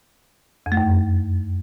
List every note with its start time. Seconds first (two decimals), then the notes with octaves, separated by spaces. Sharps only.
0.66 F2
0.72 A3
0.77 F#2